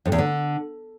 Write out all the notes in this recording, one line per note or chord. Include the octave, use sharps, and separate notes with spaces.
F2
E2
D3